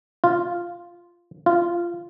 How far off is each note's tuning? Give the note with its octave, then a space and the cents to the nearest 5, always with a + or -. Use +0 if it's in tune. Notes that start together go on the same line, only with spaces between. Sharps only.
F4 -5
F4 -15